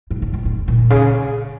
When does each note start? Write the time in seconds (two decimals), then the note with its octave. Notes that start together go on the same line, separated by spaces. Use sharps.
0.11 A2
0.22 A2
0.33 A2
0.45 A2
0.68 A#2
0.90 C#3